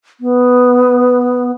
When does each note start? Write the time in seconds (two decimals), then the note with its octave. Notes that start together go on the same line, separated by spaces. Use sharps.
0.21 B3